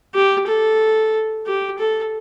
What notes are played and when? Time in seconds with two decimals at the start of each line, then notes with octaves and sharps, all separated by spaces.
0.15 G4
0.47 A4
1.47 G4
1.79 A4